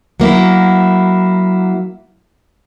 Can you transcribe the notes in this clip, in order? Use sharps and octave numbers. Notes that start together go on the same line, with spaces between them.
F#3 A#3 E4